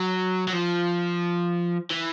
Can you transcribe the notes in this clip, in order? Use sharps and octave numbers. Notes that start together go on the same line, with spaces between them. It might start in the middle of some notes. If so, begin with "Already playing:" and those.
Already playing: F#3
F#3
F3
E3